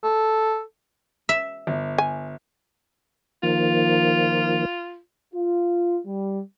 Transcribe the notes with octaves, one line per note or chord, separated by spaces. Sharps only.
A4
E5
G1
G#5
D#3 F3 A#3 F4
F4
G3